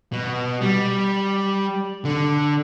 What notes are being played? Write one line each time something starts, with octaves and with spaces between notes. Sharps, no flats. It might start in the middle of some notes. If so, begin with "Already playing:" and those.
B2
G3
D3